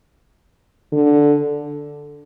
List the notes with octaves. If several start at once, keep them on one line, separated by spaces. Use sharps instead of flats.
D3